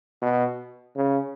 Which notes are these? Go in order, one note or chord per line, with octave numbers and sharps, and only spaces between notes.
B2
C#3